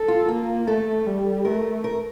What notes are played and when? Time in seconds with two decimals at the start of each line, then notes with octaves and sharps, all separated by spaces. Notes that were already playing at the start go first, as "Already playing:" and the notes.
Already playing: A4
0.08 F4
0.28 A#3 F4
0.67 A3 A4
1.06 G3
1.45 A3 A#4
1.84 A#4